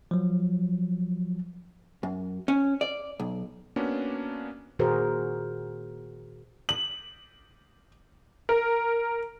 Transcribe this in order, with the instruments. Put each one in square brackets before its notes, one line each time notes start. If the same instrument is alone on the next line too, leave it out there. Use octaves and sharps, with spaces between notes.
[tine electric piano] F3 F#3
[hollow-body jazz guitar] F#2
C#4
D5
B1
[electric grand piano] A#3 B3 C#4 D4 F#4 B4
[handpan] A#2 D#3 F#4 G#4 A#4 C5
[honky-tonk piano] F#7
A#4